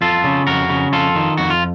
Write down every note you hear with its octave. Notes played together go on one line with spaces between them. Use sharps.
F2 F4 A4
C#3
F2 F#4 A#4
C#3
F2 F4 A4
D#3
F2 F#4
F4